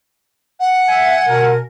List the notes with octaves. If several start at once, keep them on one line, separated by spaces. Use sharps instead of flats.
F#5
E5 G#5
B2 A#4